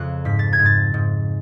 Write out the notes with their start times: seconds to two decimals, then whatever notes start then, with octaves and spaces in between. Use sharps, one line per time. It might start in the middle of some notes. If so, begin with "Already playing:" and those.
Already playing: F2 C#3 F#6
0.25 G#2 B6
0.39 A6
0.53 G#6
0.59 G#2
0.66 A6
0.94 G#2